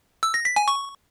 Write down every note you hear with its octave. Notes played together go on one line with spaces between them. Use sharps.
E6
A#6
B6
G#5
C#6